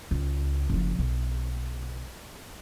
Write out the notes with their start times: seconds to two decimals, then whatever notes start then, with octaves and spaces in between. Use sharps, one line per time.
0.11 C#2
0.69 F#1 F3
0.99 B1